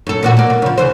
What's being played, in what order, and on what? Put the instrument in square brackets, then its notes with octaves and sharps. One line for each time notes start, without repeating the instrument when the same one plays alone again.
[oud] F#2 A4
A#2 E3 F#4
A#3 D5
B2
C#3 F3
C#3 E3 C5